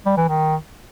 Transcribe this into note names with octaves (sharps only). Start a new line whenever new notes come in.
G3
E3
D#3